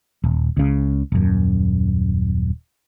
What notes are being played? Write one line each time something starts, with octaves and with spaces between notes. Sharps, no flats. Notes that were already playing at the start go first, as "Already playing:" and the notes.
D#1
C#2 C#3
D#1 F#2